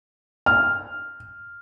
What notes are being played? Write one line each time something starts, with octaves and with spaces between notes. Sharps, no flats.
F6